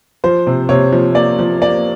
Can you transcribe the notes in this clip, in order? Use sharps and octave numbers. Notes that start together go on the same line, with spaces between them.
F3 C5
C3
C3 C#5
F3
A#3 D5
F3
A#3 D5